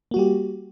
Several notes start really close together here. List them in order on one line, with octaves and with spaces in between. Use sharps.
A#3 F#4 G3 G4